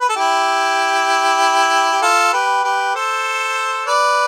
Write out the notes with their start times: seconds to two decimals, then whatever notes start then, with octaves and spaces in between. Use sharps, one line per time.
0.01 B4
0.09 A4
0.16 E4 G4
1.91 G4
2.02 F4 A4
2.33 G4 B4
2.64 G4 B4
2.95 A4 C5
3.87 B4 D5